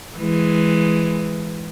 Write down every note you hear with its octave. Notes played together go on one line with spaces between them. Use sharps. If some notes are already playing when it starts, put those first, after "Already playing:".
E3 G#3